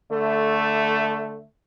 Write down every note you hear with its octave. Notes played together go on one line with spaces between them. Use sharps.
D3 A3